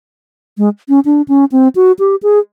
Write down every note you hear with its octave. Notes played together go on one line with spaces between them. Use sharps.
G#3
C#4
D4
C#4
C4
F#4
G4
G#4